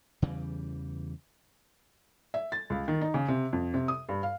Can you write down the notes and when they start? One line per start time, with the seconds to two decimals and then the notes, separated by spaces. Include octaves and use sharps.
0.22 E2 C#3 E3 G3
2.34 E5
2.52 A6
2.70 C#2
2.88 D#3
3.01 D#4
3.14 C#3
3.28 C3
3.53 F2
3.74 C3
3.88 D#6
4.09 G2
4.23 F5